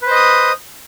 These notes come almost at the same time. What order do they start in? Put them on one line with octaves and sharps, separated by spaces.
B4 C5 D#5 D#6